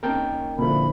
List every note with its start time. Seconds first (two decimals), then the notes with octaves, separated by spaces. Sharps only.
0.03 A#3 C#4 D#4 A#4 G5 A5
0.59 A#2 D3 F3 C#4 E4 B4 B5